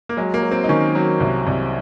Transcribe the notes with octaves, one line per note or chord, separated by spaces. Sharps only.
A#3
F#3 G#3
A#3
F#3
C4
D#4
D#3 C#4
F#3
C2
C2